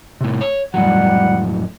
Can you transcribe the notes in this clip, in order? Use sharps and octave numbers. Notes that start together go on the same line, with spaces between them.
A2 C3
C#5
F2 A2 F#3 G3 F#5